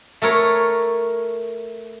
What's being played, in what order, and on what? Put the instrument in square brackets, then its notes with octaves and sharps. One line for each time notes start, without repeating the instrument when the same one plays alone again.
[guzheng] A3 A4 A#4 C#5